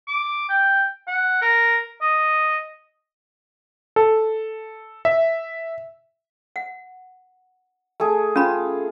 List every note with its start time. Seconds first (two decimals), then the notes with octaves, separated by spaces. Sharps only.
0.08 D6
0.49 G5
1.08 F#5
1.42 A#4
2.01 D#5
3.96 A4
5.05 E5
6.56 F#5
8.00 A3 G#4
8.36 C#4 F4 B5